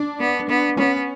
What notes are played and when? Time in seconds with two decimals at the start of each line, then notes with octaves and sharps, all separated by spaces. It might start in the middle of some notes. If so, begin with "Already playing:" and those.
Already playing: D4
0.20 B3
0.49 B3
0.77 B3 C#4